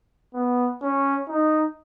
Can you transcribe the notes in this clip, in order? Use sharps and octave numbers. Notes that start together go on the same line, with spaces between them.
B3
C#4
D#4